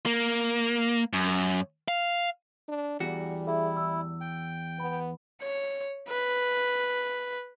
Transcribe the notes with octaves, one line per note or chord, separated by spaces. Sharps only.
A#3
F#2
F5
D4
E2 G3 F#4 C#7
E4 G#4 E5
E6
G5
B3 B5
C#5
B4